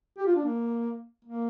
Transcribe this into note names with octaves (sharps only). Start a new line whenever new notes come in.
G4
F4
D4
A#3
A#3